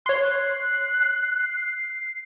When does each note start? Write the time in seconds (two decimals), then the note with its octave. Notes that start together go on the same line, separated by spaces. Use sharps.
0.06 C#5 C6 F#6 C7